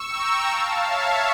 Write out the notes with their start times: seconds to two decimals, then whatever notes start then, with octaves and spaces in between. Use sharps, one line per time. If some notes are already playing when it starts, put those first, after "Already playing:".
Already playing: C#6 E6
0.09 G5 A#5
0.45 F5 A5
0.81 C#5 E5